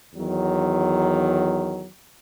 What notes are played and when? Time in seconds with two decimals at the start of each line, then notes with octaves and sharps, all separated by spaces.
0.14 E2 D#3 F#3